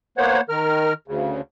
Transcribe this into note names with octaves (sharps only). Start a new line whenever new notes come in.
A#3 B3 C5 C#5 F#5
D#3 A#4 F6
D2 C#3